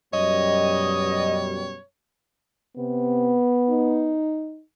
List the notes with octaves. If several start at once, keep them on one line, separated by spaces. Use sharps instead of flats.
F#2 B2 G3 C#5 D#5
C3 B3
D#4